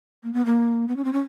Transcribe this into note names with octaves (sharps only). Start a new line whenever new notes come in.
A#3
B3
A#3
B3
C#4
C4
C#4